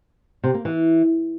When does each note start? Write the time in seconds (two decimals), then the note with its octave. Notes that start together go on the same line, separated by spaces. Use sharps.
0.44 C3
0.54 A#3
0.65 E3